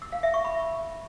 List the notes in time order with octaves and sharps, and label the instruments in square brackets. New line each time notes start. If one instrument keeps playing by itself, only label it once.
[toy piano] E6
F5
E5
C#6
B5